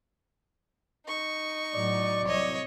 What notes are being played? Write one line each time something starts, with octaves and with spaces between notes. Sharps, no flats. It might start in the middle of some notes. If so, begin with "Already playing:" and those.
D#4 C#6
A2 F#3 D5
C2 F#3 C#5 D#5